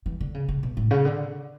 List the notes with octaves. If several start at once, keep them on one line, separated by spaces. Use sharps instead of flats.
E3
D3
C#3
C#3
B2
A2
C#3
D3